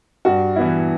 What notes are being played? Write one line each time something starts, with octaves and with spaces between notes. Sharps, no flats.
G2 F#4
E3 B3 E4